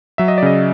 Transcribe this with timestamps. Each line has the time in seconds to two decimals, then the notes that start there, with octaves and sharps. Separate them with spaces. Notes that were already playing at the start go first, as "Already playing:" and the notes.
0.18 F#3 E5
0.28 D#5
0.38 D5
0.42 C#3 D#5